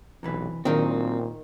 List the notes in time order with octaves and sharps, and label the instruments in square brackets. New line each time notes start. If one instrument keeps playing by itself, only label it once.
[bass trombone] B1 [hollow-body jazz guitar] C3 E3 B4
[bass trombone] A#2 [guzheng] D#3 D#4 A#4 [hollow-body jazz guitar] F#3 D4 [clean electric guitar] C4